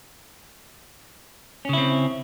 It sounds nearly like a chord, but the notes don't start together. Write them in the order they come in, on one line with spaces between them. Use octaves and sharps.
C#4 C#3 E4 C4